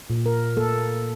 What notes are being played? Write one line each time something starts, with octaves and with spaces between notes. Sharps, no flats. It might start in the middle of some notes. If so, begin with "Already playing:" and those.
A#2
A#4
A#3 A4